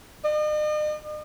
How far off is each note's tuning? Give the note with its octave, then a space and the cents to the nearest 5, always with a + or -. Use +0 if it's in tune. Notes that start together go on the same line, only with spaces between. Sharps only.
D#5 -45